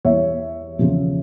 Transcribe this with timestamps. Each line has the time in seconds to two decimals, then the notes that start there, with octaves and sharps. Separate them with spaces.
0.05 E2 E3 G3 C#5 E5
0.79 E2 C#3 F3